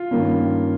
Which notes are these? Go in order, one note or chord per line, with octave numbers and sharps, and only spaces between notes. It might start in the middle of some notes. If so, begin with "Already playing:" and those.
Already playing: F4
G2 D#3 A#3 C#4